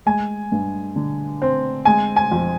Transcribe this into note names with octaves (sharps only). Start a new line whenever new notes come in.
G#3 G#5
G2
D3
C4
G#3 G#5
G#5
F2